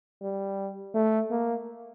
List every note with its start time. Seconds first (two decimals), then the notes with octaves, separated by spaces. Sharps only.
0.21 G3
0.94 A3
1.30 A#3